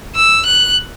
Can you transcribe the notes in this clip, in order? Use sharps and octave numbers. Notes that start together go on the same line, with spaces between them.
E6
F#6